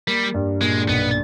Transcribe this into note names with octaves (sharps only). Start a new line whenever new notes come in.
G3 A#3
G2
A#2 G#3
B1 B3